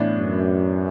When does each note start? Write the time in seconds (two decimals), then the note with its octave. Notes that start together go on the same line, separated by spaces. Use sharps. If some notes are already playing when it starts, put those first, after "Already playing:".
Already playing: A2 E3 B3 D4
0.18 F#2